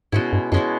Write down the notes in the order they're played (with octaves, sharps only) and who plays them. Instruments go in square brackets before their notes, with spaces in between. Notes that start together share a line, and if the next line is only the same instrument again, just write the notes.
[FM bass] G#2 [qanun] B2 G#3 C#4 E4
[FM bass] G2
[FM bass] F#2 [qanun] B2 G#3 C#4 E4